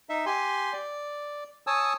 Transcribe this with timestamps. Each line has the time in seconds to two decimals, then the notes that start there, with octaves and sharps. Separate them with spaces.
0.09 D#4 E5
0.26 G4 G#5 C6
0.73 D5
1.67 C#5 G#5 A5 D#6 E6